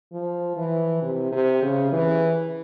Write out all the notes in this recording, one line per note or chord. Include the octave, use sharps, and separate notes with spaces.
F3
E3
C3
C3
C#3
E3